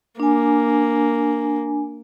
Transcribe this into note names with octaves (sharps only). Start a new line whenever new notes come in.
A#3 D4 G#5